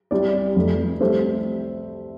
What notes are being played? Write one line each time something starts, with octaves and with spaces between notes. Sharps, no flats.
C2 C3 G3 D5
F1 F2 F3 A3
C2 C3 A3 C5